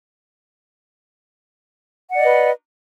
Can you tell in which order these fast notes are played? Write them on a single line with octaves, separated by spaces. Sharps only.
F#5 D5 D#5 B4